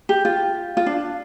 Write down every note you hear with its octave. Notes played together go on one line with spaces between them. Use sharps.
G4
F4
F4
D4